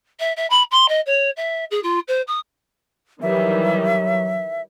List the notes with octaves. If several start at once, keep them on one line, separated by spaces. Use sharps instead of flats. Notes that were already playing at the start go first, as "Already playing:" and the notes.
E5
E5
B5
C6
D#5
C#5
E5
G#4
F4
C5
D#6
D#3 E3 F#3 G3 E5